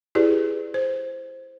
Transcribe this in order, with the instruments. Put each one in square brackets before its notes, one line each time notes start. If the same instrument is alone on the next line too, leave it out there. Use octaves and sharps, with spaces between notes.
[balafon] E4 G4 G#4 B4 D5
C5